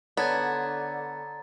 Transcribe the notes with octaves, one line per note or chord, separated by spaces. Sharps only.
D3 B3 C#5 A5 A#5 G#6 A6